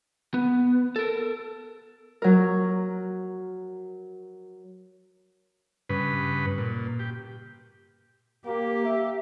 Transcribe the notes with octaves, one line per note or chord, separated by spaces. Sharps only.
B3
A4 A#4
F#3 A#4
G2 C#3 B4
A#2
G4
A#3 G4
E5